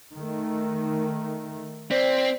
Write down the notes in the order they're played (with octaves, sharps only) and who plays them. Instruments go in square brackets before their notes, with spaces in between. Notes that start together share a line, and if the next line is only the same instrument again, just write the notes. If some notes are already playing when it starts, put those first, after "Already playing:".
[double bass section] D#3 A3
[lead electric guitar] C4 [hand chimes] C5 D5 B6